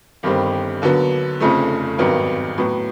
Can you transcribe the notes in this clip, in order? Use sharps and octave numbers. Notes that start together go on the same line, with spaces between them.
G1 G2 D#3 G3 C4
D#2 D3 F#3 B3
F1 F2 C#3 F3 A3
G#1 G2 D#3 F#3 B3
A2 F#3 B3